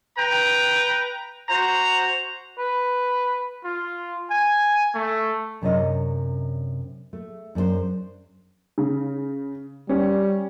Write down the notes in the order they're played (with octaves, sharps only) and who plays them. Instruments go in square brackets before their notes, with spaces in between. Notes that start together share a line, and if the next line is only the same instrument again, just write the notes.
[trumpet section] B4 G5 A#5
F#4 C5 A#5
[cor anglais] B4
[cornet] F4
G#5
A3
[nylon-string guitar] F#2 C3 D4 C#5 D#5
A3
F#2 D4 G#4 C5
[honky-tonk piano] C#3
[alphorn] G3 [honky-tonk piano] C#4